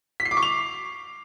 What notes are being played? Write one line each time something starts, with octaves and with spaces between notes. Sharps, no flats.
B6
C7
D6
C#6
F7